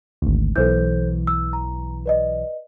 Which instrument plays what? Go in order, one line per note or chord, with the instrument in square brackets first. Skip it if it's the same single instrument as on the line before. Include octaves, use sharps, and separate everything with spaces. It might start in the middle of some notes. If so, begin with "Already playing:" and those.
[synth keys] G#1 D2
[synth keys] B1 E3 [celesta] A4 C5 G6
[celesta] E6
A#5
B4 D5 D#5